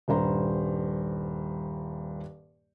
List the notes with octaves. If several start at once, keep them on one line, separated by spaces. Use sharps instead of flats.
D#1 G2 C5 A#5